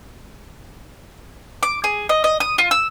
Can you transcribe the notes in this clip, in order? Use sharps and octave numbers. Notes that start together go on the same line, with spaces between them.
D6
G#4
D#5
D#5
D#6
F4
E6